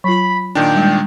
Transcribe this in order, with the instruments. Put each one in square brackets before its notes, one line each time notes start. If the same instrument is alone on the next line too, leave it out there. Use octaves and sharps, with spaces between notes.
[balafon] F#3 F4 [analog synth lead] B5
[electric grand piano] A#2 D#3 D4 [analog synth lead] G5
[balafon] G3 G#3